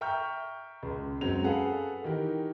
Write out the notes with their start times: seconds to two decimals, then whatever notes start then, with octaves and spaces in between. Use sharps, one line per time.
0.01 E5 G5 A#5 C#6 F6 G6
0.83 C#2
1.21 F#2 F#3 G#3 C4 C#4 F7
1.44 G#4 A4 B4 F5 F#5
2.04 D#3 E3 G4 A#4